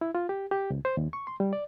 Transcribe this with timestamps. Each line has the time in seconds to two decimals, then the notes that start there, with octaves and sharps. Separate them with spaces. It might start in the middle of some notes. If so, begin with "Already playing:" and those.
0.01 E4
0.15 F4
0.29 G4
0.51 G4
0.70 C#2
0.85 C5
0.97 D#2
1.13 C#6
1.27 C6
1.40 G3
1.53 D5